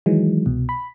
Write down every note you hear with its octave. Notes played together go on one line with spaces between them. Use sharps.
D#3 E3 F#3 G#3
C2 B2
B5